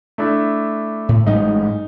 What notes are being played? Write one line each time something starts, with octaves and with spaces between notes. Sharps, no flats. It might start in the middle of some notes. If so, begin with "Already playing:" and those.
A3 D4 E4
A2
A1 G#2 G3 D#4